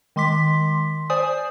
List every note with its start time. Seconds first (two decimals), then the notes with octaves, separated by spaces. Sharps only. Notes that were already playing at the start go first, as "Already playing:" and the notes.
0.16 D#3 G#3 C6 D6 B6
1.10 C5 D5 G#5 D#6